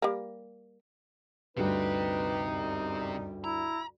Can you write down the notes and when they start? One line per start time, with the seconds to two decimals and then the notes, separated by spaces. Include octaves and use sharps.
0.02 G3 A#3
1.57 D2 G2 C3 D#4 G4 B4
2.53 F#2 G3
3.44 E4 A#5